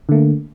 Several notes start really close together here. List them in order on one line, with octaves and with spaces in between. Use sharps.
D3 A3 A#3